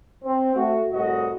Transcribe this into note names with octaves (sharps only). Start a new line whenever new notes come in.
C4
A3 F#4
C2 A2 F#4 D#5